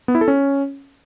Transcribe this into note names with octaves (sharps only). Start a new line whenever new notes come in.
B3
E4
A4
C#4